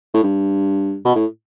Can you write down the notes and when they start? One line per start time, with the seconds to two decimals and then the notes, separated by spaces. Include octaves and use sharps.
0.14 A2
0.23 G2
1.05 B2
1.15 A2